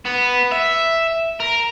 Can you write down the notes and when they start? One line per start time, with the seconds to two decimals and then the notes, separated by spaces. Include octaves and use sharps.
0.06 B3
0.52 E5
1.40 A#4